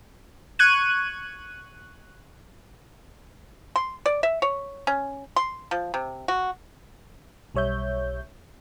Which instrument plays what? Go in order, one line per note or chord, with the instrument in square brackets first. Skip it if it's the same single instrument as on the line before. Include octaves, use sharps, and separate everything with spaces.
[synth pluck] C#6 F#6 G#6 D#7
[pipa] C6
D5
E5
C#5
C#4
C6
F3
C3
F#4
[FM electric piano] B1 G3 C#5 E5 G6